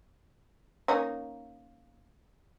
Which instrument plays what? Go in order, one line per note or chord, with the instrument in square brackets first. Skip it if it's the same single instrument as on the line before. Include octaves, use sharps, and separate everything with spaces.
[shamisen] A#3 C#4 D#4